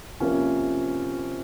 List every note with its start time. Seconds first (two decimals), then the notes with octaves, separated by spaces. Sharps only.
0.20 C3 F3 A#3 C#4